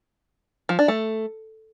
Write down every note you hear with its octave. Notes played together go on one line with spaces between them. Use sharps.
F3
D4
A3